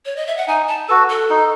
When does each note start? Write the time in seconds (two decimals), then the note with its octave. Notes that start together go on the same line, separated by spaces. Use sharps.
0.06 C#5
0.16 D#5
0.27 E5
0.37 F#5
0.48 D#4 G#5
0.68 A5
0.89 F#4 A4 B4
1.10 A4
1.30 D#4